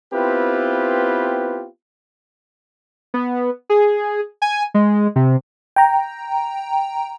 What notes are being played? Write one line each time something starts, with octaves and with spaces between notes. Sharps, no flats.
B3 C4 E4 F4 G4 B4
B3
G#4
G#5
G#3
C3
G5 A#5